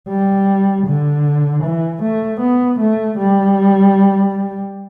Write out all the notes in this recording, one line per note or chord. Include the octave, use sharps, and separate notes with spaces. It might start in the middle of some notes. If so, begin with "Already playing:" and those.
G3
D3
E3
A3
B3
A3
G3